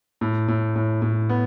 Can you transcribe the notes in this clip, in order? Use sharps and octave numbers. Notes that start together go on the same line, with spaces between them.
A2
A2
A2
A2
B3